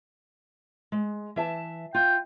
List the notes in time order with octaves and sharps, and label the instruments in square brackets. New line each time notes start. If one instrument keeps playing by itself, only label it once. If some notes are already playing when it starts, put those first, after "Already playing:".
[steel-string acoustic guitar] G#3
E3 E5 A5
[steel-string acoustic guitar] F4 [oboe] G5